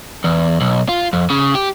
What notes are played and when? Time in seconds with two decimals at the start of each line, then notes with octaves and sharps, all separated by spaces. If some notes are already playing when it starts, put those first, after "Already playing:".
0.24 E2
0.60 B1
0.89 F4
1.13 F2
1.30 C#3
1.55 G4